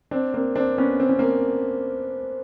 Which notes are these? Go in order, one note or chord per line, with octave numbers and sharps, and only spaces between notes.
C4 D4
A#3 C4
C4 D4
B3 C#4
C4
C#4
A#3 C4